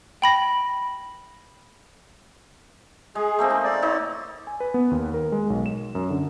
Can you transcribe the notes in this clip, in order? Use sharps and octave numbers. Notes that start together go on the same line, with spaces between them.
G5 B5 A#6
G#3 G#4
A3 A#3 C4
D#4
D5
D#4 C#5 D#5
G#5
B4
B3
D#2
A#4
G#3
B1
E7
F#2
D3